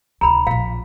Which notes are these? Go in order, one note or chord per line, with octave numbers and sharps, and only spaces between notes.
C#2 C3 A#5 B5
A#1 A#2 F5